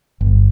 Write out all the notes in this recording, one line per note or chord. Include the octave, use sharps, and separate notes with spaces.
G1